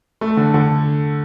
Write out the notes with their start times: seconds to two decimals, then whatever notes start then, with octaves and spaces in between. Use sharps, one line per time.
0.21 A3
0.37 D3
0.54 D3